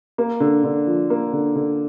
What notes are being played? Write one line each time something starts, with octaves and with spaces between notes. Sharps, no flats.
A#3
D3
D3
F3
A#3
D3
D3